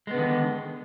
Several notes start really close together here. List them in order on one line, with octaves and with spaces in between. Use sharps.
G#3 B3 D3 D#3